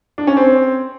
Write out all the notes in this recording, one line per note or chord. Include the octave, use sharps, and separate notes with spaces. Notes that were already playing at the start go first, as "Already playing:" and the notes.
D4
C#4
C4